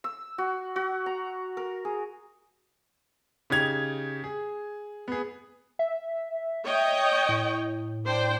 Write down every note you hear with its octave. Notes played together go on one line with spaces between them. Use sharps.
E6
F#4
F#4
A#5
A#4
G#4
C#3 D#4 G4 G#6 F7
G#4
B3 G#4
E5
C#5 D#5 G5
A2
D4 C5 G5